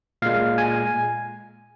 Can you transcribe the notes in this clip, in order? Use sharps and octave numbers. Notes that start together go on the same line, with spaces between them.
A#2 G#3 F5
G#5